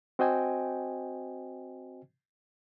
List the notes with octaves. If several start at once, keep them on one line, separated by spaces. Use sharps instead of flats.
C4 F#4 C5 D#5 G5 G#5